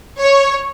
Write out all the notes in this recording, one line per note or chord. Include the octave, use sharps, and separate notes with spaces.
C#5